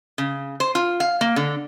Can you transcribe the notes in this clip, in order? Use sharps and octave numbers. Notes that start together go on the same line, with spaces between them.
C#3
C5
F4
F5
A#3
D3